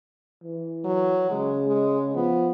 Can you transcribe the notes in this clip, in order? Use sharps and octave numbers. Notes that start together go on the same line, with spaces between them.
E3
F#3
C#3 G#3
G#3
F3 B3